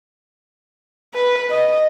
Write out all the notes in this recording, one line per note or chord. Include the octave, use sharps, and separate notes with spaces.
B4
D#5